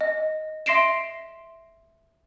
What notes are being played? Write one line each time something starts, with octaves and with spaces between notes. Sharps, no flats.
D#5
E5 C6 A#6 C7 D7 E7